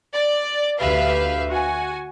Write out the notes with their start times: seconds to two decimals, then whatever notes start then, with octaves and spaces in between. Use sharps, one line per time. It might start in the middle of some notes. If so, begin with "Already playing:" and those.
0.12 D5
0.79 D2 G4 B4 E5 F5
1.49 F#4 G#5